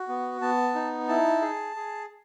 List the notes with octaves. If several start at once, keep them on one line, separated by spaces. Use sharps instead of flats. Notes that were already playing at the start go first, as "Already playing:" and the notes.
Already playing: F#4
B3
B3 A5
D#4
E4 A5
G#4
G#4